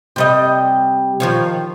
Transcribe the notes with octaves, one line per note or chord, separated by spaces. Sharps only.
C3 G3 D#5
D#3 F3 C#5